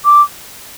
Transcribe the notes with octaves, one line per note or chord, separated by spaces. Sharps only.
D6